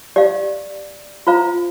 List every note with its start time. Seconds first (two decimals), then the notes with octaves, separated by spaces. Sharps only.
0.16 G4 D5 F5
1.27 F4 C5 F5 A#5